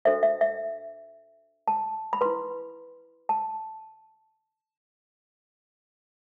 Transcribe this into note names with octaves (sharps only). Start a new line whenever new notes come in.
D4 F#4 A4 C5 E5
E5
E5
A5
B5
E4 B4 C6
A5